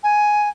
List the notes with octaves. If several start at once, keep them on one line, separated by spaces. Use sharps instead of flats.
G#5